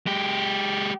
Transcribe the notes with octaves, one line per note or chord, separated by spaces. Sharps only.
G#3 G4